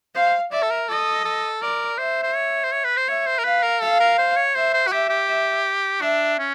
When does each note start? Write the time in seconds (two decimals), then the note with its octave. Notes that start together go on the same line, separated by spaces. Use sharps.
0.15 C5 F5
0.52 D5 E5
0.62 A4
0.70 A#4
0.88 A4 D#5
1.25 A4
1.61 A#4 D5
1.98 C5 E5
2.23 C5
2.35 C#5
2.64 C5
2.72 C#5
2.84 B4
2.97 C5
3.08 C#5 E5
3.27 C5
3.38 A#4
3.44 B4 F5
3.63 A#4
3.81 A4 F5
4.00 A#4
4.18 C5
4.36 C#5
4.55 C5 E5
4.74 C5
4.87 F#4
4.92 G4 E5
5.09 G4
5.28 E5
6.01 D4 E5
6.39 C#4